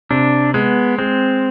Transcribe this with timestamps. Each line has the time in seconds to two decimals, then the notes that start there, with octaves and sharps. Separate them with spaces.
0.10 C3 D4
0.54 G#3 B3
0.99 G#3 C4